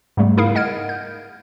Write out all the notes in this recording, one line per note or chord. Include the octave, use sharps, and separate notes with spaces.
G#2 C#3 G3 A3 B3
D#4 E4 G#4 A#4 F5
D#5 F#5 F6 G#6 D7
G6